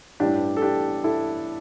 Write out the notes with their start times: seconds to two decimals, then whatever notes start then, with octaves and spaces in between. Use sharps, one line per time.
0.20 A1 G2 E3 D4 G4
0.57 A4
0.62 D4 G4
1.04 E4 A4